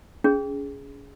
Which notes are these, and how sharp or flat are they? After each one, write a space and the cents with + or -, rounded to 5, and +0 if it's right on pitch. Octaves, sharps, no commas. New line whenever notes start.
C#4 +30 G#4 +0